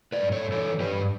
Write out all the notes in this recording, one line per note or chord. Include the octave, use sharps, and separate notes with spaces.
B4 D5
G2
A4 C#5
E3 A4 C#5
G2 G4 B4